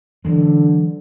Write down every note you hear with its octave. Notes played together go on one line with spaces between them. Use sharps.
D3 E3 F#3 G#3